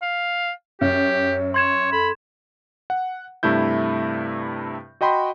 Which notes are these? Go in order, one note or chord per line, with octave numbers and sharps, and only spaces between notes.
F5
F#2 G4 C#5
C#5 C6 G#6 E7
A4 B5
F#5
G2 C3 A3 E4 G6
F#4 D#5 G5 B5 C6